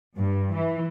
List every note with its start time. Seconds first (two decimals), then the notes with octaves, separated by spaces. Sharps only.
0.17 G2
0.56 E3